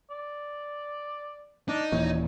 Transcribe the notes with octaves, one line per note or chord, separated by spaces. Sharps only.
D5
D4 D#4
D#1 A#2 E3 C#5